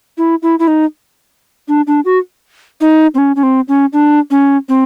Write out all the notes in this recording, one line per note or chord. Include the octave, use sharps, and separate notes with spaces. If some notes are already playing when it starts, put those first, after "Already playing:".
E4
E4
E4
D#4
D4
D4
F#4
D#4
C4
C#4
C#4
C4
C#4
D4
C#4
C4